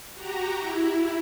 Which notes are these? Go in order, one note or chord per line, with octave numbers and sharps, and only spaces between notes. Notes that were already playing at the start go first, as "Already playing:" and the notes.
F#4 G4 A#5
E4